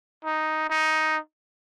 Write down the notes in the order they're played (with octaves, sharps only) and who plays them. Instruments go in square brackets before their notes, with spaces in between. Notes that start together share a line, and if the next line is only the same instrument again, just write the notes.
[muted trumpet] D#4
D#4